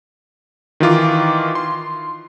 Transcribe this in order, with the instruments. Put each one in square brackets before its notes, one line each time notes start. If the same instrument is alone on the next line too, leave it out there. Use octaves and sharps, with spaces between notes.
[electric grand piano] D#3 E3 F4 D6
C6